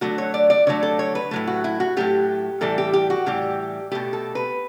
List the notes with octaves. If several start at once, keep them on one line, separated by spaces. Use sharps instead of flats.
D3 F#3 A3 F#4
C#5
D5
D5
D3 F#3 A3 C#5
A4
C#5
B4
A2 F#3 A3
F#4
E4
F#4
A2 F#3 A3 G4
A2 E3 G3 A4
G4
G4
F#4
A2 E3 G3 G4
B2 A3 G4
A4
B4